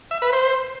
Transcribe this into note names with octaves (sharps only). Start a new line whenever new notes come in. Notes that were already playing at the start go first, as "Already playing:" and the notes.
E5
B4
C5